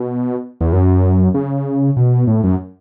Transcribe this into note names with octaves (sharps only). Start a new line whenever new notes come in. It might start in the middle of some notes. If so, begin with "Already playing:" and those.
Already playing: B2
E2
F#2
C#3
B2
A2
F#2